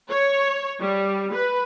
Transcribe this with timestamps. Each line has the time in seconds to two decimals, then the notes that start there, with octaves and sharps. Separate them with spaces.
0.10 C#5
0.80 G3
1.33 B4